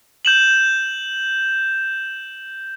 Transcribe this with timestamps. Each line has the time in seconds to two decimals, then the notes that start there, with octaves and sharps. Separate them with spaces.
0.25 G6 E7 F#7